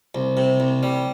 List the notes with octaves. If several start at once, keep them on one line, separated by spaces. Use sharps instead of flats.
C2
C3
C2
G3